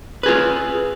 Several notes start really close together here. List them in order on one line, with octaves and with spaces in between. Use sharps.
B4 G#4 F4